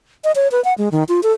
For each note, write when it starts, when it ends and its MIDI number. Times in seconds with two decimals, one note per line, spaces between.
0.24 0.32 75
0.36 0.48 73
0.52 0.63 71
0.65 0.74 78
0.78 0.89 56
0.92 1.04 51
1.09 1.21 65
1.23 1.32 69